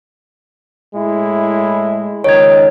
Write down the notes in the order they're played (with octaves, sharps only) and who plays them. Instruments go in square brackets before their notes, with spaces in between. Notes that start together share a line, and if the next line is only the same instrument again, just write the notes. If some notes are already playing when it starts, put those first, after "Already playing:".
[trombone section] A2 G#3 E4
[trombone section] C#2 D#3 D#4 [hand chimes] C#5 G#6